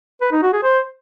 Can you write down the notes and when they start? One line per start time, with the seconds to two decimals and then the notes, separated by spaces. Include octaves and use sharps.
0.21 B4
0.32 D#4
0.42 F#4
0.52 G#4
0.63 C5